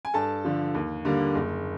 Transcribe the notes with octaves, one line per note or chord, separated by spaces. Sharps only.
G#5
G2 A4 A5
D3 F3
D#2
D3 G3 A#3
F#1